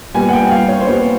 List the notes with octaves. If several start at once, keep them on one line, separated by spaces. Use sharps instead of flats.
A#2 G3 B3 G#5
F#5
G5
F5
C#5
C5
A#2 G3 B3 C#5